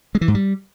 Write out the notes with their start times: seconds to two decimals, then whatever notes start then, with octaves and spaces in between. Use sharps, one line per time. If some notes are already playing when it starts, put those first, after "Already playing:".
0.15 G#3
0.21 E3
0.28 G#2
0.35 G3